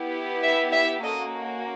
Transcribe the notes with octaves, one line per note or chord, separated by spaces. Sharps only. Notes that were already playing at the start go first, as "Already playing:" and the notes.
Already playing: B3 E4 G4
E5
E5
A#3 C#4 F#4 A4 D#5